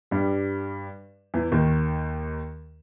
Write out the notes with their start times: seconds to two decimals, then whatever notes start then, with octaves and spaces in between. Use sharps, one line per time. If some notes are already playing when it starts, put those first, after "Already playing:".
0.11 G2 G3
1.34 E2 E3
1.52 D#2 D#3